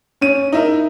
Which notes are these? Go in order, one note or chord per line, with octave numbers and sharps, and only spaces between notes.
C#4 D#7
D#4 E4 A#4